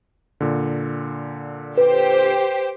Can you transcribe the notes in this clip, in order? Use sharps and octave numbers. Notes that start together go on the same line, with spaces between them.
A#2 D3
G4 B4 C5